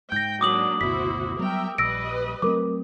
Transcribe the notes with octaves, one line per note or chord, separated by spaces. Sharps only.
G#2 G5 G6 A#6
F#3 A#3 D4 D6 D#6 F#7
F#1 D2 B2 E4 F#4 C5 B6
F#3 G3 B3 A#4 E5 G5
A#1 G3 B4 D#5 E6 A#6 D7
F#3 A3 C4 A#4 D6